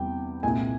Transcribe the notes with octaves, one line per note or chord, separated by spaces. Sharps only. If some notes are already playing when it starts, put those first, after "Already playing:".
Already playing: E2 C3 G3 G5
C2 A#2 G#3 G#5